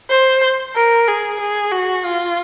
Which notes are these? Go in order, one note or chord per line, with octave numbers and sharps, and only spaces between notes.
C5
A#4
G#4
G#4
F#4
F4